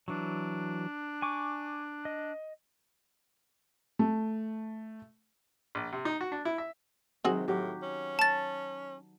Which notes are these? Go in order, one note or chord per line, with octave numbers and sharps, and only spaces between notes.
E3 F#3 D4
G#5 C#6 D6
D#5
A3
A#1
C3
D#4
F#4
D4
E4
E5
C3 D#3 F#3 G#3 C4 F#4 G#4
A2 F#3 G4
C#4
A5 A6